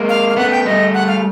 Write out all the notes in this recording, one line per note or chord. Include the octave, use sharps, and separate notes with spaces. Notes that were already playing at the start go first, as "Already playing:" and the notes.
Already playing: G#3 A#3
F5
F5
A3 B3 F#5
G5
G3 A3 D#5
F#5
F5